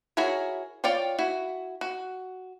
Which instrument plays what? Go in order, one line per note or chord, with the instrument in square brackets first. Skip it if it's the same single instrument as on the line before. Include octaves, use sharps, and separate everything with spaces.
[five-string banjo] E4 F#4 G#4 A#4 C#5
F4 C#5 D5 F5 G5
E4 F#4
F#4